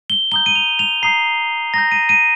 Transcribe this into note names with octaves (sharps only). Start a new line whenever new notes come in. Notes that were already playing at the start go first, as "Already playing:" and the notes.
G7
A#5 D#6 G6 G7
D#7
F7
F7
A#5 D#6 G6 C7
A#5 D#6 G6 A#6
D#7
D#7